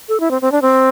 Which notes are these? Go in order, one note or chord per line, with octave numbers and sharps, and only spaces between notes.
A4
E4
C4
C4
D4
C4